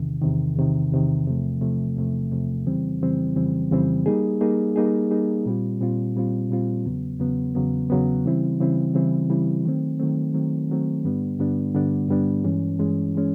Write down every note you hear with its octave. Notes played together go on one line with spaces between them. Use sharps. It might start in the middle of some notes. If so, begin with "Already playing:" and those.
Already playing: E2 C3 D#3
E2 C3 D#3
E2 C3 D#3
E2 C3 D#3
E2 C3 F3 A3
E2 C3 F3 A3
E2 C3 F3 A3
E2 C3 F3 A3
F2 C#3 E3 G3 C4
F2 C#3 E3 G3 C4
F2 C#3 E3 G3 C4
F2 C#3 E3 G3 C4
G3 A#3 D#4 G#4
G3 A#3 D#4 G#4
G3 A#3 D#4 G#4
G3 A#3 D#4 G#4
A#2 G3 C4 F4
A#2 G3 C4 F4
A#2 G3 C4 F4
A#2 G3 C4 F4
E2 C#3 F#3 B3
E2 C#3 F#3 B3
E2 C#3 F#3 B3
E2 C#3 F#3 B3
C#3 E3 G3 C4 E4
C#3 E3 G3 C4 E4
C#3 E3 G3 C4 E4
C#3 E3 G3 C4 E4
D#3 F#3 A3 C4
D#3 F#3 A3 C4
D#3 F#3 A3 C4
D#3 F#3 A3 C4
G2 D3 G3 B3 D4
G2 D3 G3 B3 D4
G2 D3 G3 B3 D4
G2 D3 G3 B3 D4
G2 E3 G#3 C#4
G2 E3 G#3 C#4
E3 G#3 C#4